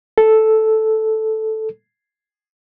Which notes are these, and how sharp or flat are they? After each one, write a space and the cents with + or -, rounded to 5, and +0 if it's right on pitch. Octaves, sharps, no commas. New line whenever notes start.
A4 -5